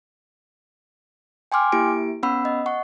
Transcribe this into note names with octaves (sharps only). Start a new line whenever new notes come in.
G5 G#5 C6 D6 F6
A#3 E4 G4 D7
B3 C#4 F#5 B5 E6
D#5
F#5 C#6